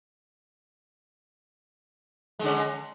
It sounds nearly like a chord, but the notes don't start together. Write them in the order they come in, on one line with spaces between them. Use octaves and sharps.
G#3 D3 C#4